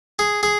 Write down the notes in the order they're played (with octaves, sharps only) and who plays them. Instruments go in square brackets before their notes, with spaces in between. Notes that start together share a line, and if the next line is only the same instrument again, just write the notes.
[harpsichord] G#4
G#4